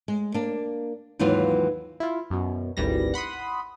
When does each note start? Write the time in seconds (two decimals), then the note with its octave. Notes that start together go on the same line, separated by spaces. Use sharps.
0.08 G#3
0.34 A#3 D4
1.19 D#2 G#2 E3 F#3 F4 B4
2.00 E4 F4
2.30 F#2 B2
2.77 G#1 D2 E3 G3 A#6
3.14 F#5 B5 C6 D#6